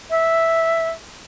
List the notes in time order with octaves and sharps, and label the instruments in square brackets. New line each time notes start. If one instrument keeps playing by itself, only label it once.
[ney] E5